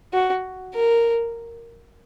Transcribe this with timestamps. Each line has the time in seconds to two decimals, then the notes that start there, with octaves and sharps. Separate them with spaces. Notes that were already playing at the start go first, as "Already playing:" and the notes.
0.13 F#4
0.75 A#4